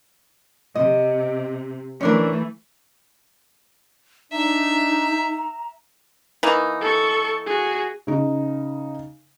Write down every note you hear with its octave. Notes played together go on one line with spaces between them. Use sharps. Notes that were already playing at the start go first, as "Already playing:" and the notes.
C3 D#5
E3 A3 C#4 D4 A#4
D4 D#4 E5 A#5
E3 A#3 D#4
A4 C#6
F#4 G#4
C#3 D#4